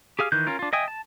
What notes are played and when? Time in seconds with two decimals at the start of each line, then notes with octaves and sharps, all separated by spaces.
0.19 G4 G#4 F5 F6
0.32 D#3 E3 F#6 G6
0.47 C#4 F4 A#4
0.59 D4 F4
0.73 D#5 E5 G5 G#5 D#6
0.88 A5